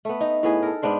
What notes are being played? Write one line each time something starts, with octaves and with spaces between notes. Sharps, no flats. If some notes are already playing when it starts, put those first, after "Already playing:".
A3 B3
D#4
A2 B3 G#4
A4 A#4
G#2 B3 D4 C5